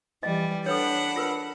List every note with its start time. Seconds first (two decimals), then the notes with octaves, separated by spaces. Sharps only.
0.23 E3 G3 D#5
0.66 D4 A4 B4 C#5 F#5 B5
1.16 F4 A#4 B4